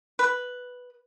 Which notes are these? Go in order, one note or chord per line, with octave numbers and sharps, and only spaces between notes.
B4